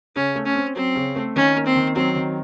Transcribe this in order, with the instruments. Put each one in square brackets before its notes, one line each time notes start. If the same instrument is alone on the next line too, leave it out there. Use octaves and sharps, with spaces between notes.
[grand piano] C#3 [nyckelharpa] C#4
[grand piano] A3
[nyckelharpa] C#4
[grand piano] C4
[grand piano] F#3 [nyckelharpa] C4
[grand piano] C#3
A3
[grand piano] D#3 [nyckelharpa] C#4
[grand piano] A#3
[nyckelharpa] C4
[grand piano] D#3
[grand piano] F#3 [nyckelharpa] C4
[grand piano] D#3